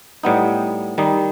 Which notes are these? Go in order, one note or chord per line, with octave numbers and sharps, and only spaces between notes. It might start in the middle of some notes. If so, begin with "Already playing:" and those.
A2 G3 B3 D#4
D#3 G3 D#4